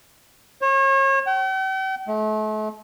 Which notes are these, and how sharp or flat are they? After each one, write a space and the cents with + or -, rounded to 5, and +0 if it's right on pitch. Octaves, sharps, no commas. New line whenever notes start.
C#5 -35
G5 -45
A3 -40